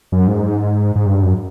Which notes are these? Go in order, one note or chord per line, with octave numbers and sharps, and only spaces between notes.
F#2
G#2
G#2
G2
F#2